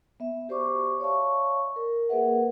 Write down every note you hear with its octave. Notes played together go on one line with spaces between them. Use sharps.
B3 E5
F#4 G4 C5 D5 C#6 D6
C#5 D5 E5 F5 A5 C#6
A#4
A#3 G#4 A#4 B4 E5 F#5